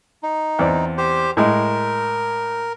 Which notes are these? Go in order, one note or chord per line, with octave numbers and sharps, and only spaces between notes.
D#4
E2 C4 D5
G4 C5
A2 G#3 A#4